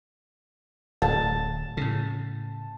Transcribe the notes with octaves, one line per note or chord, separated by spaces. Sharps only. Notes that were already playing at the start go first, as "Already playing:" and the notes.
D1 A5
A2 C#3